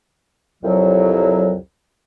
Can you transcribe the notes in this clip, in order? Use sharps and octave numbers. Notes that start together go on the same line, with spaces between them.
C2 F2 F#3